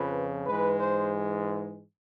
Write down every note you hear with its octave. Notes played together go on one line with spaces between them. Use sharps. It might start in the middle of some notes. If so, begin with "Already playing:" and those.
Already playing: F2 C#3 F3 B4
G#2 E3 G#3 B4
C5